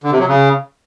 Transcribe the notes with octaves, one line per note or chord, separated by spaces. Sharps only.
D3
C3
F#3
C#3